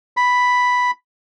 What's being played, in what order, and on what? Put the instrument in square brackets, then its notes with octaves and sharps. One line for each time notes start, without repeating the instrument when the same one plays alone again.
[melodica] B5